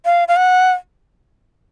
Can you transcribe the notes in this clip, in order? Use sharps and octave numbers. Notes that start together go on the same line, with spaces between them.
F5
F5
F#5